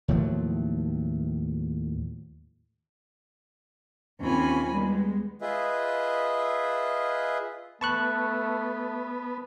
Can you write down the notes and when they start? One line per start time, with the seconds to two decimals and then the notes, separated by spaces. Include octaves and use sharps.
0.08 D#2 A2 F3 F#3
4.21 D#2 C4 C#4 F4 G#5 B5
4.71 G3 G#3 B3
5.41 F4 G#4 B4 D#5 E5
7.81 A3 B3 A5 C#6 F#6